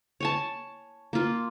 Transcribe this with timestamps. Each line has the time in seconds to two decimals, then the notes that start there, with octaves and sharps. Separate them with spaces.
0.20 C#5 G#5 A5
1.13 A#3 F4